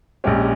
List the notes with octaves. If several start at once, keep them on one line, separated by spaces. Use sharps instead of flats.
A#1 A#2 G#3 C#4 G4